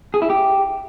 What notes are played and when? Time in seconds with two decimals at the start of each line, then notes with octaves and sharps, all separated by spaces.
0.14 G#4
0.22 E4
0.30 G4